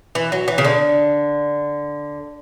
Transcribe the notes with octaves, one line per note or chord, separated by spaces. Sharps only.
E3
F#3
E3
C#3
D3